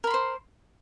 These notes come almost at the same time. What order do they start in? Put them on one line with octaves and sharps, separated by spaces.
A#4 B5 C6 C5